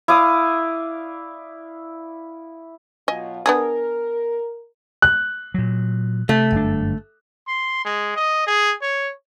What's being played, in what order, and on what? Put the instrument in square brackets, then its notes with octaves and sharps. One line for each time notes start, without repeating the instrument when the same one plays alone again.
[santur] E4 D5 F5 D#6
[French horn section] B2 F#3 F4 [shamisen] D#5 G#5
[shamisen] B3 D4 G#4 [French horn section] A#4
[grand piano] F#6
[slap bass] A#2 F#3
[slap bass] C3 [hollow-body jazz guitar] A3
[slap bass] G1 F#2 D4
[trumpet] C6
G#3
D#5
G#4
C#5